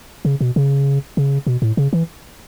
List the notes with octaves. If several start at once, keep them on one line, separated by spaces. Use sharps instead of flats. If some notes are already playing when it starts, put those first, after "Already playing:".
C#3
B2
C#3
C#3
B2
A2
C#3
E3